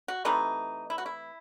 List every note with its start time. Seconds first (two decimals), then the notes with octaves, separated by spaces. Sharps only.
0.08 F#4
0.25 C3 E3 A3 D#4
0.90 E4
0.98 F#4
1.06 E4